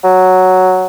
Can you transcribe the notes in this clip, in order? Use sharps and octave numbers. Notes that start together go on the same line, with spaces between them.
F#3